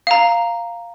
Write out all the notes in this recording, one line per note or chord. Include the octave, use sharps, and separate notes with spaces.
F5 A#5